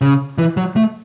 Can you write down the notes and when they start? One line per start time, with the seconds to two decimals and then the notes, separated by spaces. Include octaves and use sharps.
0.01 C#3
0.38 E3
0.57 F#3
0.76 A3